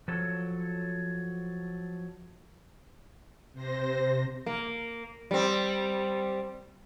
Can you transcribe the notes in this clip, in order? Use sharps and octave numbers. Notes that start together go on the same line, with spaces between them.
F3 F#3 A4 C#5
C3 C5 A#6
A#3
G3 C4